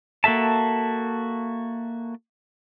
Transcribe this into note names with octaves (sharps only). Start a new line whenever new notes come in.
A#3 F#4 A4 E5 A5